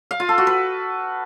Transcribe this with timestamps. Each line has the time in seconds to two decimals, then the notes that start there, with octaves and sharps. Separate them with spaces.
0.11 F5
0.20 F4
0.29 A4
0.38 F#4
0.47 B4